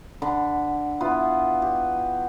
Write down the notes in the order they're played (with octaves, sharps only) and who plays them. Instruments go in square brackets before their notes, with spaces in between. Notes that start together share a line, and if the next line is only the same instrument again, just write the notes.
[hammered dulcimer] D3 B5
B3 E4 F4 B4
G4